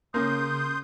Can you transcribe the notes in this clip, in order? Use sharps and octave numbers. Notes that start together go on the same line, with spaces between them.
C#3 A#3 C#4 C6 D#6 G6